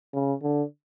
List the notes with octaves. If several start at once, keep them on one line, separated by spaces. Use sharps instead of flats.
C#3
D3